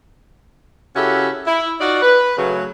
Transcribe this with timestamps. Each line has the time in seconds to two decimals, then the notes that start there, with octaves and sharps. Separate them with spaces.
0.96 C#3 C#4 E4 F#4 G4 A4
1.47 E4
1.80 D#4 F4 F#4 D5
2.02 B4
2.38 C#3 F#3 A3